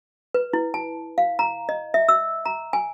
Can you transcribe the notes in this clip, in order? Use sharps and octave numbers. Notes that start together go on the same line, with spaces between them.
B4
E4
A5
F5
A#5
D#5
E5
E6
A#5
G#5